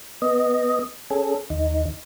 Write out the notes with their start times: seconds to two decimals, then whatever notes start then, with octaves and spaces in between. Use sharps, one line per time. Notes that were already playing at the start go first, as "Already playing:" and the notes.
0.22 B3 D#5
1.10 C#4 G#4 A4
1.50 D#2 D#4